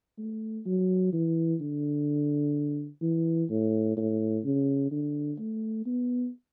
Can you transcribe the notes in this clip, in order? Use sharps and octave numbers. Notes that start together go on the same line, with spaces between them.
A3
F#3
E3
D3
E3
A2
A2
C#3
D3
A3
B3